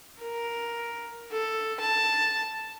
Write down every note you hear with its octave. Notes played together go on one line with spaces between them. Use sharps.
A#4
A4
A5